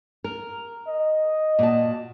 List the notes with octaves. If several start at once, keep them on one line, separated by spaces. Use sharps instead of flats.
A#4
D#5
A#2 F#4 A5